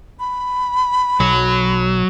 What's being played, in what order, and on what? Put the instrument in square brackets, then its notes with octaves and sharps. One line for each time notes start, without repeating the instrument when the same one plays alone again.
[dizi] B5
[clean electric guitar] B1 [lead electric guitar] F#3